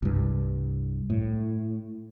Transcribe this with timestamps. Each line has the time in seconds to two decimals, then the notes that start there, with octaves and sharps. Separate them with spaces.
0.02 C2 G2
1.10 A2